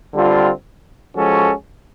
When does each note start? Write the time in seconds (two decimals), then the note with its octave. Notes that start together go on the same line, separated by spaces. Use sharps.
0.14 D3 G3 C4 F4
1.15 F3 G#3 C#4 F#4 A4